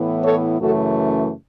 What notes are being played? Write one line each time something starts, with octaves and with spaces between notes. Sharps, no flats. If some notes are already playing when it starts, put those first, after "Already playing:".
Already playing: A2 E3 B3
A4 C#5
F#2 C#3 E3 A3 F#4 A4